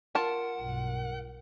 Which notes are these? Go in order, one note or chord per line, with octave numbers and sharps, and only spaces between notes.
F4 A#4 F#5 A5
B1 G2 B2